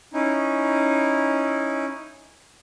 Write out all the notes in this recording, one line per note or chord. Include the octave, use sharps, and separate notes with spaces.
C#4 D#4 E4